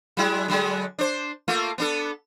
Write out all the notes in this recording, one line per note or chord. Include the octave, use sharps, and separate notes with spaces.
F#3 G#3 E4
D3 F#3 G#3
D4 C5
A3 A#3 F4
B3 D4 A4